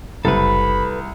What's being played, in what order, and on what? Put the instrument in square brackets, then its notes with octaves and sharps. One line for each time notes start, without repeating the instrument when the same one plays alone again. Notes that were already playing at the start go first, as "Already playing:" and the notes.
[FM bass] F#1 [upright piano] C2 [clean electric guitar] A4 B4 [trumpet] B5